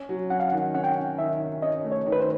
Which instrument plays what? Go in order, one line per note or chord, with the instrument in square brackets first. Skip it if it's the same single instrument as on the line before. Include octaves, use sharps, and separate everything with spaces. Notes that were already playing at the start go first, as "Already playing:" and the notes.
Already playing: [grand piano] C#4
F#3
[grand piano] C#4 [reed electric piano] F#5
[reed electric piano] F5
F#5
[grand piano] D#3
[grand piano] C#4 [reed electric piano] F#5
[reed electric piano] G5
F#5
[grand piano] C#4
[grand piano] D#3 [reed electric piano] E5
[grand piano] C#4
[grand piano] C#4 [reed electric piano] D#5
[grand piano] A3
[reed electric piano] C#5
[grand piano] D#3
[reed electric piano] B4
C5